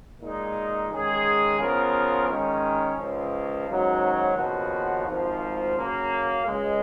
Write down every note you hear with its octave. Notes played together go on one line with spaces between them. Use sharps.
A#2 G#3 D#4
D#3 G#3 C#4 G#4
C#3 F3 B3 F4 A#4
D#3 G#3 C#4
C#2 C#3 F3
G#2 D#3 F#3 C#4
D#2 C#3 F3 B3 F#4
G#1 G#2 F3
C#3 F#3 A#3
C#2 C#3 G#3